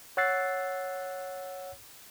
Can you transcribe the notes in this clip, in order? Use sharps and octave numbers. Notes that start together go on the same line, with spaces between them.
C#5 F#5 E6 F#6 A6 C7